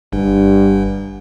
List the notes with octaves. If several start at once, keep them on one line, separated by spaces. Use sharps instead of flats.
G1 G2